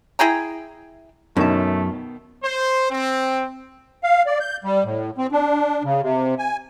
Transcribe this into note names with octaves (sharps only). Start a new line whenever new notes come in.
E4 G#4 G5 A#5
F#2 B2 D#3 A3 C#4 A#4 A5
C5
C4
F5
D5
G6
G3
A2
C4
D4
C#3
C3
G#5